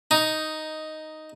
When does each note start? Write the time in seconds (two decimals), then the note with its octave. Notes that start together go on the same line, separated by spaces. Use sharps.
0.11 D#4